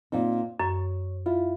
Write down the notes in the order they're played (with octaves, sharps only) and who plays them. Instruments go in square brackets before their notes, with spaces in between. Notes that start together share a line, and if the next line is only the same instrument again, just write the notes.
[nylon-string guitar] A#2 C4 D#4
[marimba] F#2 [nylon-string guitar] C#5
[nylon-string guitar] E4 F4